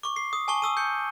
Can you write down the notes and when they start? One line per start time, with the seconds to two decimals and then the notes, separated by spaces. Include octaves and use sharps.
0.03 C#6 D6
0.16 C7
0.33 D#6
0.48 G#5 A5 C#6 G7
0.62 D#6 E6 D#7
0.77 G6 C#7